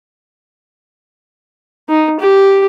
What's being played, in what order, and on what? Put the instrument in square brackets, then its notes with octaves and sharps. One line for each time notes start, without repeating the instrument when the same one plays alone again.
[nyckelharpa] D#4
G4